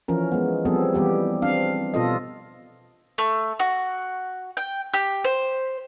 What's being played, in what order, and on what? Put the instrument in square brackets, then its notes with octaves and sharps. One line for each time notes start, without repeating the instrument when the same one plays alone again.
[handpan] E3 F3 C#4 A#4
G#3 B3
F3 G3 B3 C4 G#4 A4
E3 G3 B3 G4
C4 D4 F5
B2 F4 A4 D#5
[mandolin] A3
F#4
G5
G4
C5